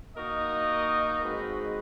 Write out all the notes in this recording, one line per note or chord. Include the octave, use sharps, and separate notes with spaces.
A#3 D#4 F#4 A#4 D#5
G#3 C4 D#4 F#4 B4